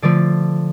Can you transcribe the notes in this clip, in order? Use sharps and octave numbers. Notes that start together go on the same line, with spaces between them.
D3 F3 A3 D5